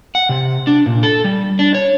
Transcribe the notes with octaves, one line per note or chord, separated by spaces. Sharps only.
F#5
C3
D4
A#2
A4
G3
D4
C#5